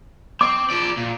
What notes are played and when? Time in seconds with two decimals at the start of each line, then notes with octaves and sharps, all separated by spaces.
0.41 C4 D6
0.70 F3 D5
0.97 A#2